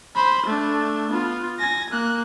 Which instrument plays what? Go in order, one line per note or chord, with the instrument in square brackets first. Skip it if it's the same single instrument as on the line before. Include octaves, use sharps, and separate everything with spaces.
[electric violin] C5 B5
A3 D4
B3 F4
G#5 A#6
A#3 F#6